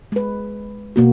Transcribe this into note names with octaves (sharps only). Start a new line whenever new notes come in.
G#3 B4
B2 A#3 F#4